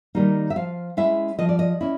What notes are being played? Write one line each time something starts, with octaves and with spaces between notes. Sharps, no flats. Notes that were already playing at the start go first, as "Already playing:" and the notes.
D#3 G3 A#3 D#4
E5
F3 F5
G#3 C#4 E4 E5
F3 D#5
D5
D#5
C#4 E4